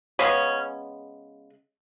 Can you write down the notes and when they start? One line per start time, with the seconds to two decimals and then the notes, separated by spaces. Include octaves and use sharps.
0.19 C#3 G#3 B3 C#4